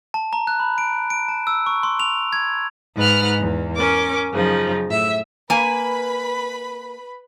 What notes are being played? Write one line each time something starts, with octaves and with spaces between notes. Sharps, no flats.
A5
A#5
F#6
B5
D7
D7
A5
E6
C#6
C6
F7
G#6
G#2 B4 F#5 F6
E2
C#4 A#4 D6
F#2 C#3 F3 D#4
A2 E5
A#3 B4 G#5 B5